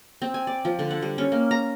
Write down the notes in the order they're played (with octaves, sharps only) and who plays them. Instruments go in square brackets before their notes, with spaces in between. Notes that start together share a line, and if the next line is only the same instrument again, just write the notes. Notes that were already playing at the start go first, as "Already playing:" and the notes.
[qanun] C4
G#5
D5
F3
D3
F#5
G3
C#4
A#3
A#5